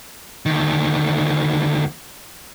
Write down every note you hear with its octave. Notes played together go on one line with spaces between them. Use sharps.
D2 D#3